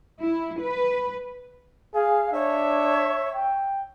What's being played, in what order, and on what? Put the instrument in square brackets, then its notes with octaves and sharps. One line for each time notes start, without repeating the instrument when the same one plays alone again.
[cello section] E4
B4
[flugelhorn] G#4 [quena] F5
[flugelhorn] D4 [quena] C#5 [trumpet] E5
[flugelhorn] G5